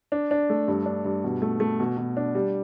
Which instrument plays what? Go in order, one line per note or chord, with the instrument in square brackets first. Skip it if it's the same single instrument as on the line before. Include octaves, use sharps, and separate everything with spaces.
[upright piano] D4
D4
A3
G2
D4
G2
B2
A3
A3
B2
B2
D4
G3